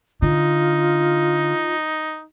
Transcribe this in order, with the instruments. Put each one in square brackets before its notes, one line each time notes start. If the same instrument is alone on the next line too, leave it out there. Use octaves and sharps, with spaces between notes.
[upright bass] D3 [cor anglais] D#4 [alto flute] F4